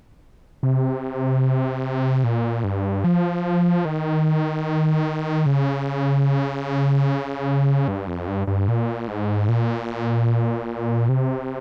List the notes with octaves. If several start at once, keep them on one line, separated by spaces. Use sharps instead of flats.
C3
A#2
G2
F3
D#3
C#3
G2
F2
G2
G2
A#2
G#2
A#2
C3